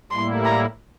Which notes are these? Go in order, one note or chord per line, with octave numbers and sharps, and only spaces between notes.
A2 G3 A#3 E4 C6
A#5